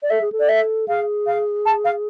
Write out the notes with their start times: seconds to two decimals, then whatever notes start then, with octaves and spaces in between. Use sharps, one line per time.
0.02 D5
0.10 A4 E5
0.21 G#4
0.32 A4
0.39 D5
0.48 E5
0.88 G#4 F5
1.26 F5
1.65 A5
1.84 F5